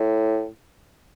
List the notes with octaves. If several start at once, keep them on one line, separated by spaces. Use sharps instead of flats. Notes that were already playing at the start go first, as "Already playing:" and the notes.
Already playing: A2